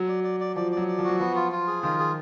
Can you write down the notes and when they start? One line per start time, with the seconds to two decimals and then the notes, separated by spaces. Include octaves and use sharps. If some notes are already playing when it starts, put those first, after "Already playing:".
Already playing: F#3
0.08 D5
0.24 D5
0.40 D5
0.56 F3 D5
0.72 D5
0.77 F#3
0.88 D5
0.99 F3
1.04 F#3 F#4
1.20 F3 B3
1.35 F4
1.52 F4
1.67 G#4
1.83 D#3 F4
1.99 G#4